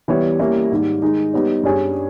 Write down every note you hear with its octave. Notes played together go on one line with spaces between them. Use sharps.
E3 G3 B3 G4 C#5
G3 A#3 C#4 E4 G4
G#2 D#3 G3
D#3 G#3 D#4
G3 B3 D#4 G4 C#5
G2 G3 C#4 G#4